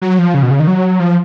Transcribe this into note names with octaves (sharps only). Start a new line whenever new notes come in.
F#3
F3
C#3
B2
C#3
D#3
F#3
F3